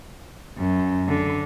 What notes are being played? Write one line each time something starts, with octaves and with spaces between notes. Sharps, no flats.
F#2
D3